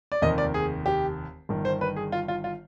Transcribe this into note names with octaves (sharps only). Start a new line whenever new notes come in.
D5
F1 D#2 D#3 D#5
D5
G#4
G4
G1 G2 D#3
C5
B4
G#4
F4
F4
F4